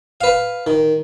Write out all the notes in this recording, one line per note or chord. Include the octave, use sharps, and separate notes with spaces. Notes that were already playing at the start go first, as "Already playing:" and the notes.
B4 F5
D#3